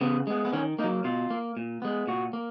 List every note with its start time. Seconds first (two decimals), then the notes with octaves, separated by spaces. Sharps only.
0.01 C#3 B3
0.27 G#3 B3
0.45 B3
0.53 D#3 C#4
0.79 A#3 D#4
0.84 F#3
1.04 B2 F4
1.30 A#3
1.57 A#2
1.82 G#3 B3
2.07 A#2 F#4
2.33 A#3